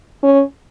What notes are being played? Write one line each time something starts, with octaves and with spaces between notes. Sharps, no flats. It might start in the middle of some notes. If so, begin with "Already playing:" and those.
C#4